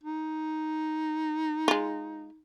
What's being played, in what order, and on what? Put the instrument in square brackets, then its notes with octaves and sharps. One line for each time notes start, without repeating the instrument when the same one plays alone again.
[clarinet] D#4
[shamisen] G#3 F4